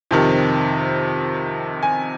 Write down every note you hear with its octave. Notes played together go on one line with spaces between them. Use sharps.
F2 C3 D#3
G#5